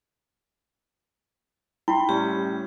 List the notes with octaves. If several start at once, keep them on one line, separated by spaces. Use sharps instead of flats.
E4 G5 B5 C6
A2 G3 C#4 G4